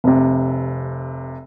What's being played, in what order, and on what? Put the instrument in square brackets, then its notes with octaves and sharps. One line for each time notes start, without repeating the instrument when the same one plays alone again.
[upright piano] F1 C3